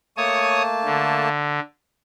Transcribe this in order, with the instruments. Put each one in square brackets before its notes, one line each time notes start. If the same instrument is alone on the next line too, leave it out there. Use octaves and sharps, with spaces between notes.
[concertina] A3 A#3 A5 [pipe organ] C#5 D#6
[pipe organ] D3